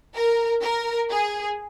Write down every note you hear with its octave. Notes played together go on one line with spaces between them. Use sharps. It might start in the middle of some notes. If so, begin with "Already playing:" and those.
A#4
A#4
G#4